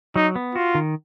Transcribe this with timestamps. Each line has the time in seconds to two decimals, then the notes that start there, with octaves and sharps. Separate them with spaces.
0.16 F#3 D#4
0.36 B3
0.55 F4 F#4
0.75 D#3